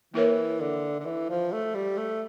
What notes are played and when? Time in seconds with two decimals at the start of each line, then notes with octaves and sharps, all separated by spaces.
0.14 E3 A#3 E4 A#4 C#5
0.60 D3
1.00 D3
1.05 E3
1.30 F3
1.53 A3
1.75 G3
1.98 A3